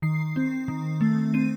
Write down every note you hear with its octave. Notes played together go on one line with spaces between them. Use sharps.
D#3 C7
C4
D#3
A3
C4 D#7